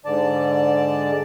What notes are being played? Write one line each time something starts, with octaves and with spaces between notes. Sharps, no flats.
G#2 D3 D5 A5